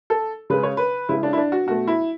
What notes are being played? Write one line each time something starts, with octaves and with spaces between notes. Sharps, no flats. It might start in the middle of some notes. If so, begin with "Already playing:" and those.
A4
C#3 G#3 B4
C#5
B4
C#3 G#3 E4
D4
E4
D4
F#4
B2 A3 F#4
E4